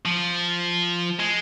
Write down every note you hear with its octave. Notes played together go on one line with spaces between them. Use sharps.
F3
G#3